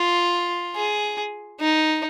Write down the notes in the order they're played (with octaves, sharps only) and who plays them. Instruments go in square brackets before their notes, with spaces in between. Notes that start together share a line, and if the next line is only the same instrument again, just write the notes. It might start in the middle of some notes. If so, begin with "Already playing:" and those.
Already playing: [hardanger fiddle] F4
G#4
D#4